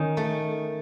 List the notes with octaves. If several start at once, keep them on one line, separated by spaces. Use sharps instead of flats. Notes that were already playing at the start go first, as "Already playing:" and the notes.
Already playing: D#3 C#4
A3